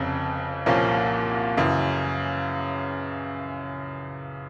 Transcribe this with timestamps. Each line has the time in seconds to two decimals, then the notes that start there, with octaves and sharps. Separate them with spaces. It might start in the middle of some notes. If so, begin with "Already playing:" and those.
Already playing: F1 F2 C#3
0.66 C2 A#2 F3 A#3 C#4
1.57 F#2 C#3 E3